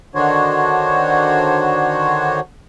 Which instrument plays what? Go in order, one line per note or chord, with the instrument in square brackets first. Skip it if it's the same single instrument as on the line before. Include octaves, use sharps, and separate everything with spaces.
[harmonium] D3 D#3 D4 F#4 C5 C#5